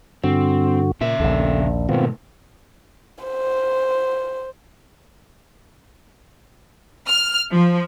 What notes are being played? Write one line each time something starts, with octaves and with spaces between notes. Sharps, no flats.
G2 D3 C4 F#4
A#2 C#3 E5
A#1 D#2 A4
G#2 B2 D#3 A3 B3 C4 F4
C5
F6
F3